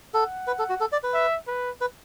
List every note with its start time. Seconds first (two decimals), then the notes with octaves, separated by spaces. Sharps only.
0.14 A4 F#5
0.47 B4
0.59 A4
0.70 F#4
0.80 A4
0.92 D5
1.03 B4
1.14 E5
1.47 B4
1.81 B4